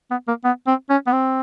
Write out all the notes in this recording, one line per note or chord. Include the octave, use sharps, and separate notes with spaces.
B3
A#3
B3
C4
C#4
B3
C4